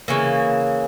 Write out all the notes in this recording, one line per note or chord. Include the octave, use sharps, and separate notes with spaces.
C#3 E3 A#3